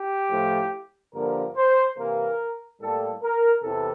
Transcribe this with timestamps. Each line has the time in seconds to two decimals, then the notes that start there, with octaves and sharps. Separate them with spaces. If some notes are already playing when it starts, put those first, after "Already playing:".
Already playing: G4
0.30 A2 F3 A3
1.13 G2 D3 F3 A#3 A#4
1.56 C5
1.96 C3 E3 A#3 A#4
2.80 A2 G3 A#3 A4
3.22 A#4
3.63 E2 C3 E3 A4